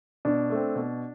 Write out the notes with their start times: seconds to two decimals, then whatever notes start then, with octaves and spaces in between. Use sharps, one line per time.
0.25 B2 D4
0.50 A3 C4
0.75 B2